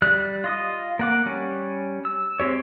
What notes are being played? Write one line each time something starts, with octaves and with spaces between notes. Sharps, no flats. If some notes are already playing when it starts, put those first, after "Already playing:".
G3 F#6
F4 D#5 D#6
A#3 F#5 D6
G3 C#4
E6
G#3 C4 G4 C#5